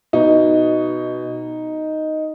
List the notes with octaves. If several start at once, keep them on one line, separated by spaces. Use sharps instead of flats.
B2 D#4